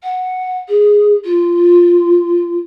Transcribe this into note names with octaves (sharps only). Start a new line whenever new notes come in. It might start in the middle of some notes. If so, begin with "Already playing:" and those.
F#5
G#4
F4